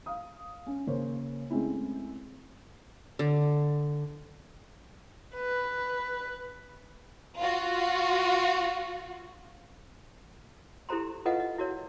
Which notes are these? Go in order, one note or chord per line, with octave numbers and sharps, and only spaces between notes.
F5 D#6
C#4
C#3 A#3 A#4 C5 C#5
G#3 A3 C4 C#4 E4
D3
B4
F4 F#4
E4 G4 A4 C5 A#5 C6
F4 A4 B4 D#5 F5 F#5
D#5
E4 F#4 A#4 C#5